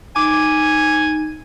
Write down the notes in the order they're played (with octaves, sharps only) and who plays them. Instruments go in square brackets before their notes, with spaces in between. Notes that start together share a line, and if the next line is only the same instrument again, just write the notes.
[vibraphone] D#4 [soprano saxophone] G#5 [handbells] D6